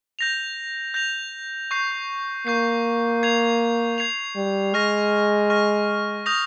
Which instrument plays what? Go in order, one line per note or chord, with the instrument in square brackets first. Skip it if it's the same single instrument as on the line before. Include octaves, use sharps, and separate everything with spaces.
[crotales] G6 A#6 F7
G6 A#6 F7
C#6 G6 C7
[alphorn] A#3 [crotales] C#6 G6 C7
[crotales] G#6 C7 F7
G#6 C7 F7
[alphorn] G3
[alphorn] G#3 [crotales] C#6 F6 A#6
[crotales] C#6 F6 A#6
D#6 G6 A#6 F7